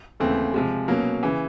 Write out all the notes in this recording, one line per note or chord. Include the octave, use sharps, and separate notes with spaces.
D#2 C#3 E3 A3 C4
C3 F3 G#3
B2 F#3 A#3 C#4
C#3 E3